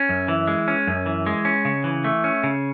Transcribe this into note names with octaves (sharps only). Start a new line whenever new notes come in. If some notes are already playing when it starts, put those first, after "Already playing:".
Already playing: C#4
F#2
E3
G#3
C#4
F#2
E3
G#3
C#4
C#3
E3
A3
C#4
C#3